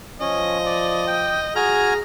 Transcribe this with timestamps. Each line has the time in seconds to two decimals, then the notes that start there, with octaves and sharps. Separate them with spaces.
0.21 F3 C#4 D#5
0.66 D5
1.07 G5
1.56 F#4 G#4 G#5 A#5 F6